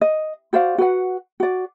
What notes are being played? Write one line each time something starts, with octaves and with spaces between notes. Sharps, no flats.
D#5
F#4 C5 D5 F5
F#4 B4 F#5
F#4 D5